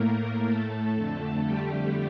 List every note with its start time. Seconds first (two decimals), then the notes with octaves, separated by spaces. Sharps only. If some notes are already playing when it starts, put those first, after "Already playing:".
Already playing: A2 A3 A#3 A#4
0.46 A3 A4
0.96 F2 D3 A3
1.45 G3 G4